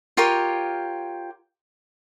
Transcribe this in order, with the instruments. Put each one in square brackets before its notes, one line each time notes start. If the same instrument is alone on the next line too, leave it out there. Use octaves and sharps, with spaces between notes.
[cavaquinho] F4 G4 A#4 C#5